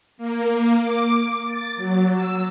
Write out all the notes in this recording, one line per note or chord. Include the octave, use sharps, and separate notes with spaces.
A#3
D6
A6
F#3
E6